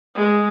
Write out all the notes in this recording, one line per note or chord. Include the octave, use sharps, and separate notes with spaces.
G#3